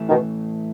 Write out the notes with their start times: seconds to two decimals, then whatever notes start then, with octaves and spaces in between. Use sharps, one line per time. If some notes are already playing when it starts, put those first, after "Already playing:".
Already playing: A2 E3 A3
0.09 B2 D#3